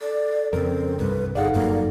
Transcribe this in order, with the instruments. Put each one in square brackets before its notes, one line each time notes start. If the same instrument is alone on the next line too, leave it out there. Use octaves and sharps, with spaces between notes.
[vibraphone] A4 [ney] D5
[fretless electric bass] F2 C#3 [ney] C4 [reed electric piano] A#4
[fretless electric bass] C2 G2 [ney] B4
[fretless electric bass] G1 [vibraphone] D#4 A4 [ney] G#4 [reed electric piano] D5 F5 F#5
[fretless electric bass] F#1 G2 F#3 [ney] A#3